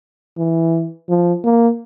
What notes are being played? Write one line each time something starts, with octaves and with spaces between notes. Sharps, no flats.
E3
F3
A#3